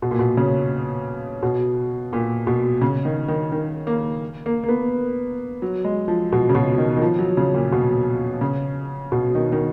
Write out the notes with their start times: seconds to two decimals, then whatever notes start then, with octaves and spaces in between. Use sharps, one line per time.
0.02 B2
0.11 A#2
0.19 B2
0.37 C#3
1.42 B2
2.13 A#2
2.47 B2
2.81 C#3
3.05 D#3
3.28 D#3
3.52 D#3
3.87 A#3
4.46 A#3
4.64 A#3
4.69 B3
5.62 F#3
5.85 G#3
6.08 F3
6.32 B2
6.49 C#3
6.55 B2
6.78 D#3
6.97 D#3
7.02 F3
7.19 F#3
7.37 C#3
7.54 A#2
7.72 B2
8.41 C#3
9.12 B2
9.35 D#3
9.52 D#3